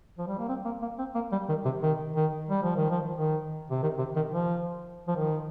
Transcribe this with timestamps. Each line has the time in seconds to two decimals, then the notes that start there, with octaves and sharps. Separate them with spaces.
0.18 F3
0.28 G3
0.39 A#3
0.49 C4
0.65 A#3
0.82 A#3
0.99 C4
1.15 A#3
1.32 G3
1.49 D#3
1.65 C3
1.82 D#3
2.16 D#3
2.49 G3
2.63 F3
2.76 D#3
2.90 F3
3.16 D#3
3.70 C3
3.83 D#3
3.99 C3
4.16 D#3
4.32 F3
5.08 F3
5.17 D#3